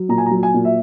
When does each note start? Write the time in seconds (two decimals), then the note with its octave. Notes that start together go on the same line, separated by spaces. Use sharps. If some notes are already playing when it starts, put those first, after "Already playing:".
Already playing: F#3
0.09 A#2 A#5
0.18 G#5
0.26 A#5
0.31 F#3
0.43 G#5
0.54 A#2
0.65 E5